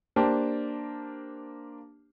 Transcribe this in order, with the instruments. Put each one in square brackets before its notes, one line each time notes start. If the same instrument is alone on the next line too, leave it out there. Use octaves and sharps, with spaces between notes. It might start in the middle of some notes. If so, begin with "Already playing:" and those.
[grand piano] A#3 D4 G4 C5 A5